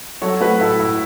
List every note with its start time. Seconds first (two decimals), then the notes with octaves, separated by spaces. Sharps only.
0.22 F#3 A4 C#5
0.40 A3 F#4 B4
0.60 A2 E4 A4
0.79 A2 E4